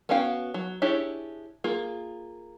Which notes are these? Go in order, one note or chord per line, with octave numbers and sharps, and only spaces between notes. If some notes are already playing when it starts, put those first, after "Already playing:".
B3 C#4 F#4 F5 G5
F#3
D4 E4 G4 G#4 C#5
A#3 F4 G#4